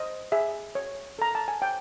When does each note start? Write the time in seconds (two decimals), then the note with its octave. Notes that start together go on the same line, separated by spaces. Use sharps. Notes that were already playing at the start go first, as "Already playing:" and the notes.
Already playing: C5 D#5
0.32 G#4 E5
0.75 C#5
1.19 A4 A#5
1.35 A5
1.48 G#5
1.62 C#5 G5